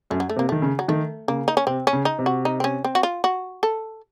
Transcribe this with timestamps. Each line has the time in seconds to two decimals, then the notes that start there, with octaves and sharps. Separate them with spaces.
0.11 F#2 A3
0.20 F#3
0.29 A3
0.36 C3 A#3
0.49 D#3 A3
0.62 C#3
0.79 F#3
0.88 D#3 A3
1.28 C#3 A#3
1.48 D#4
1.57 C#4
1.67 C3 C4
1.87 C#4
1.93 C#3
2.05 D#4
2.19 C3
2.26 F#4
2.45 D#4
2.60 C4
2.64 C#4
2.84 C4
2.95 F#4
3.03 F4
3.24 F#4
3.63 A4